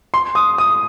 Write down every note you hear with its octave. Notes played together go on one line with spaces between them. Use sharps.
C6
D#6
D#6